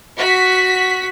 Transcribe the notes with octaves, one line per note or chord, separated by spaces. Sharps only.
F#4 B6